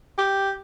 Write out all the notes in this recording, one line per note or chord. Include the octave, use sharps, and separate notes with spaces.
G4